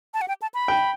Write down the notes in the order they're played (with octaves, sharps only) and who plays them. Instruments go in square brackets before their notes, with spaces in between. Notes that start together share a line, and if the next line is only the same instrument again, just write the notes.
[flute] A5
F#5
G5
A5
B5
[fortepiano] G5